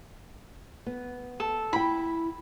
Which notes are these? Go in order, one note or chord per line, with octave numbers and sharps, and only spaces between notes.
B3
A4
E4 G5 B5